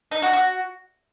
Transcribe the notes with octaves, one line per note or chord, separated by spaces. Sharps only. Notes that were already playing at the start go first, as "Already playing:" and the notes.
D#4
F#4
F#4